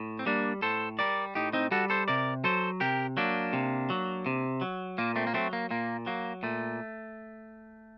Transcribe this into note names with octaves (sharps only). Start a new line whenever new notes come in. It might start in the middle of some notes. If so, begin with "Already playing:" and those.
Already playing: A2
C4
G3 A#3 D4
A2 A4 C5
G3 A#4 D5
A2 D#4 G4
C4 D#4
G3 F#4 A4
A4 C5
C3 A#4 D5
F#3 A4 C5
C3 G4 A#4
F#3 A#3 D4
C3
F#3
C3
F#3
A#2 A#3
A3 C4
A#3
F#3 A3 C4
A#3
A#2 A#3
F#3 A#3
A#2 A3